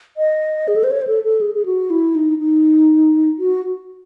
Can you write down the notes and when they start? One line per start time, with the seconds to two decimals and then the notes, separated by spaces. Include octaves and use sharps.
0.17 D#5
0.68 G#4
0.76 A4
0.84 C5
0.91 C#5
1.01 C5
1.07 A4
1.24 A4
1.41 G#4
1.55 G#4
1.65 F#4
1.90 E4
2.15 D#4
2.39 D#4
3.39 F#4